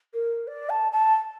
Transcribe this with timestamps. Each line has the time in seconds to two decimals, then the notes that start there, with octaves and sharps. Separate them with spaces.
0.14 A#4
0.47 D5
0.70 A5
0.92 A5